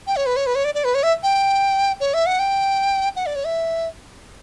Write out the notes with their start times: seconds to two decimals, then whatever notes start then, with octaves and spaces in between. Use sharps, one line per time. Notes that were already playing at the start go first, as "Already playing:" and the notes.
0.07 G5
0.16 C#5
0.26 B4
0.36 C#5
0.46 B4
0.55 C#5
0.65 D5
0.75 D5
0.84 B4
0.95 C#5
1.03 E5
1.23 G5
2.00 C#5
2.14 E5
2.26 F#5
2.39 G5
3.16 F#5
3.26 D5
3.36 C#5
3.45 E5